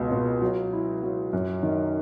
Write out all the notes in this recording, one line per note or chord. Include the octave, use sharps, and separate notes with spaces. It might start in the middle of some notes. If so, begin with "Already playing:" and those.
Already playing: C#2 B2
B2
F#3
E4
F#3
F#2
D#3